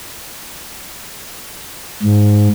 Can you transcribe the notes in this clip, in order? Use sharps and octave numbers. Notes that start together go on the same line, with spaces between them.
G#2